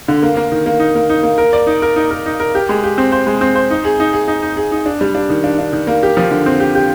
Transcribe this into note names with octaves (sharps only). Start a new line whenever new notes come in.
D3
A#3
A#3
D#3
A#3
D#4
A#3
D#4
A#3
A#4
D5
D#4
A#4
D#4
A#4
D#4
A#4
G4
G#3
G4
C4
C5
G#3
C4
C5
D#4
G#4
D#4
G#4
D#4
D#4
G#4
D#4
D4
G3
D4
D#3
D4
D4
D#3
A#3
G4
F3
D3
C4
G4
G4